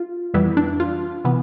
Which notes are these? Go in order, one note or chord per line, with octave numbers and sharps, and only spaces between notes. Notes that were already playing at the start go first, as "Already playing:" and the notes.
Already playing: F4
F2 E3 G3 B3 E4
D4
F4
C3 E3 B3